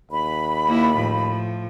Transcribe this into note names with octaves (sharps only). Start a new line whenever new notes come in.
D#2 B5
A#3 E4
A2 F3